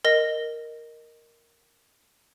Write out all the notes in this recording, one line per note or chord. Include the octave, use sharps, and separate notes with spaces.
A#4 D#5 A#6